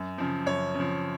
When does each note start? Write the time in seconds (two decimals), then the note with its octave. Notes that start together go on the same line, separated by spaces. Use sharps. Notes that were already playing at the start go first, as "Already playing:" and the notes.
Already playing: F#2
0.18 C#3 F3
0.46 F#2 C#5
0.75 C#3
0.80 F3